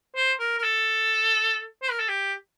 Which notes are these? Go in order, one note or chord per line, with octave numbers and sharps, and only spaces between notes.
C5
A#4
A#4
A4
C5
A#4
A4
G4